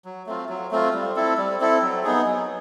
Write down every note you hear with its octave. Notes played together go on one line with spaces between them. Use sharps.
F#3
A3 C4 F4
F#3
A3 C4 F4
G3
C4 E4 A4
G3
C4 E4 A4
F#3
B3 D#4 G#4
F#3